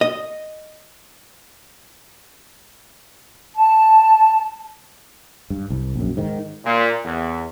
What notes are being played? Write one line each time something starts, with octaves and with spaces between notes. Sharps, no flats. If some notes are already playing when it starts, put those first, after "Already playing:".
D#5
A5
G2
C2
A#1 F#2
G#2 D#3
A#2
E2